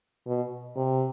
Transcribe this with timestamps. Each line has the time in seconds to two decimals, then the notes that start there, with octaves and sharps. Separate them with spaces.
0.27 B2
0.76 C3